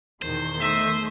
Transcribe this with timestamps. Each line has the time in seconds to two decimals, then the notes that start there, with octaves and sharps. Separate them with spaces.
0.22 E2 B2 D#3 C5
0.59 A3 D#5 E5